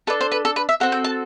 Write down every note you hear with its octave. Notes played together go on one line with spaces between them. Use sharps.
D4 A4 B4
C5
B4
A4
B4
E5
C4 F#4 A4 F#5
G5
A5